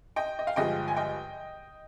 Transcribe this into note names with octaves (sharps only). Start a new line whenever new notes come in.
D#5 G5
D#5
F5
G2 D3 F3 G#3 D#5 G5
G#5
D#5 G5